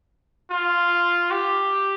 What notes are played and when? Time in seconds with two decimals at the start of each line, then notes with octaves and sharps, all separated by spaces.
0.51 F4
1.31 G4